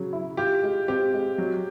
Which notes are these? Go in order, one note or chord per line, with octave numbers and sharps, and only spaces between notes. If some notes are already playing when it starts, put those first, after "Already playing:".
Already playing: C#3 F#3
E4
F4 G4
G#3
C4 G4
G#3
F#3